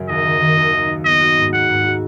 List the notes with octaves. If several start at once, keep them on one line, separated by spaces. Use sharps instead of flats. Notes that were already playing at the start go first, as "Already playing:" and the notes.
Already playing: F#2 C#3 F#3
D#2 D#5
D#3
D#3
D#2
D#4
D#4
B3 D#5
F#4
G#2
B3 F#5
G#2
F#4